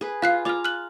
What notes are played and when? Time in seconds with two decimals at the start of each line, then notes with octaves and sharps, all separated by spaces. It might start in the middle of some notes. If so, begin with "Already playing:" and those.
0.01 G#4 B4
0.22 F4 G#4 F5 F#6 C7
0.45 F4 F5 A#5 D6 F6
0.65 F6 F#6 F#7